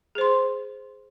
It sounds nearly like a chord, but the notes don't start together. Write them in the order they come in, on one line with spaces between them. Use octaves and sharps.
G#4 C5 C6